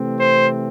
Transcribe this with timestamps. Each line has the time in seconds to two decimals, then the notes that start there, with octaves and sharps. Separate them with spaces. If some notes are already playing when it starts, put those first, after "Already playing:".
Already playing: C3 E3 A3 C4
0.19 C5